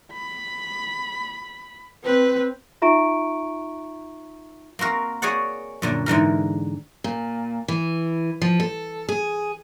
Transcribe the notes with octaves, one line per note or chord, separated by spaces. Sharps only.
B5
C4 B4
D#4 F4 E5 A#5 C#6 D7
A#3 C4 F#4 A#4
F#4 G#4 C#5 D5 F#5
F#2 A#2 D3
G#2 D3 E3 A#4
A#2
E3
F3
A4
G#4